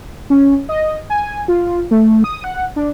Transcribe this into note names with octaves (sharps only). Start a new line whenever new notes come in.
C#4
D#5
G#5
F4
A3
D#6
F#5
D4